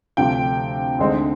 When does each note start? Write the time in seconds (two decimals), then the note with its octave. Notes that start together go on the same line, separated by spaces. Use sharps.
0.17 D2 C3 F3 G5
0.99 D2 D3 G#3 C4 D#4